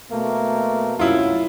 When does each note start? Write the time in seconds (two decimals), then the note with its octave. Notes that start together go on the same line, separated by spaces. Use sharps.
0.11 B2 A3 A#3
0.99 C2 F#2 E4 F4